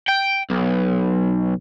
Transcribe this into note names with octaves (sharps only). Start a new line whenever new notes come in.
G5
B1